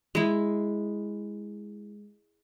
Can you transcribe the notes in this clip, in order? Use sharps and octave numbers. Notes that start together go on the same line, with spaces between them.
G#3 E4